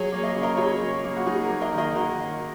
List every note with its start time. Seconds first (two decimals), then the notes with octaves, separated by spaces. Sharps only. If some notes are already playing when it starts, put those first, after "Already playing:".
Already playing: F#3 G#4 C#5
0.12 A#3
0.24 D#5
0.34 C#3
0.43 A#4 D#5
0.57 C#3 G#4 C#5
0.81 F#3
1.04 A#3
1.16 F#4
1.26 F#3 D#4 G#4
1.43 F#4 A#4
1.49 A#3
1.61 A#4 D#5
1.73 D#3 A#4 D#5
1.95 D#3 F#4 A#4